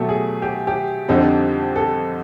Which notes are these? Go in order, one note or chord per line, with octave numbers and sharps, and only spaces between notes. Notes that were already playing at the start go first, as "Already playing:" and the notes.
Already playing: B2 F#3 A3 G4 A4
G#4
G4
G4
F2 D3 G3 C4 D#4
A4